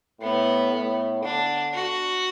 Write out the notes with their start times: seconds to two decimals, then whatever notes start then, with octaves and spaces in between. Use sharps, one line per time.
0.21 A2 B3
0.72 A2
1.23 D3 D4
1.73 F#4